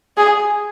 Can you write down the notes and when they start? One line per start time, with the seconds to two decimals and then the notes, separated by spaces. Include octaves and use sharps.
0.17 G#4